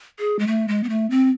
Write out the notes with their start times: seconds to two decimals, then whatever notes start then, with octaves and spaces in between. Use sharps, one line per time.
0.19 G#4
0.39 G#3
0.47 A3
0.68 G#3
0.84 B3
0.89 A3
1.10 C4